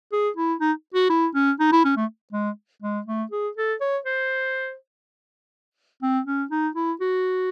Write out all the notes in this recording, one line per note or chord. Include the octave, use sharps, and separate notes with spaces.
G#4
E4
D#4
F#4
E4
C#4
D#4
E4
C#4
A3
G#3
G#3
A3
G#4
A4
C#5
C5
C4
C#4
D#4
E4
F#4